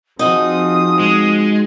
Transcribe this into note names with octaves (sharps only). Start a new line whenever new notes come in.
F3 C4 D#4 F#4 G#4 D#6
G#3